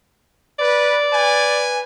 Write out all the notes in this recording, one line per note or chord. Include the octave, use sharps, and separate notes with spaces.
B4 D5
B4 G#5